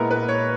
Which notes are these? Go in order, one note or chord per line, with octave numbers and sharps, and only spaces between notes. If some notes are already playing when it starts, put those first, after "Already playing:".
Already playing: A#2 G#3 B3 E4 A#4
B4
C#5